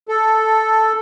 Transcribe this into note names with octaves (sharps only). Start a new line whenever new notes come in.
A4